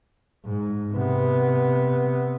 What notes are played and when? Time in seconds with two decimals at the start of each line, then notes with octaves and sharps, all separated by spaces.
0.45 G#2
0.93 C3 B3